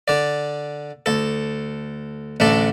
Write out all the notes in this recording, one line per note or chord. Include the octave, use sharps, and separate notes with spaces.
D3 D5
D2 A4
A1 D2 A3 D4 A4